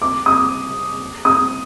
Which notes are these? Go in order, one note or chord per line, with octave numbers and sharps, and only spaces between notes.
D6
D#6
D#6